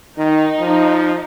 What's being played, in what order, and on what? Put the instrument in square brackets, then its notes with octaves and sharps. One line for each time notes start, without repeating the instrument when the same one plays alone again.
[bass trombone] D#3 [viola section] D#4
[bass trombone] F3